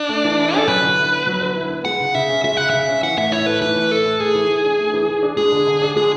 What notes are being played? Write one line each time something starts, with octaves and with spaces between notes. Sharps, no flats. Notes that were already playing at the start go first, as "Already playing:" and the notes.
Already playing: D4
A3
E3
E4
C#4 A4
F#3 B4
D3
E4
B3
F#3
D3
E4
B3
G#3 F#5
C#3
C#3 E5
C#4
G#3 E5
C#3 F#5
C#3 E5
C#4
E3 F#5
A2 E5
E4 C#5
A3 B4
E3 B4
A2
E4 A4
A3
A3 G#4
E3
E3
D4
A3
E3
E3
D4
G#3 G#4
D3
D3
D4
G#3 G#4